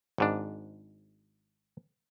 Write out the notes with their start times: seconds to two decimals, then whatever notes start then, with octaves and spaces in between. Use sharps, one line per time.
0.18 G#1 G#2 D4